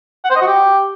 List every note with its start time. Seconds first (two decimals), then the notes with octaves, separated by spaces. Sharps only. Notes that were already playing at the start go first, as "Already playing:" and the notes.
0.25 F#5
0.30 C5
0.36 D#5
0.42 F#4
0.47 G4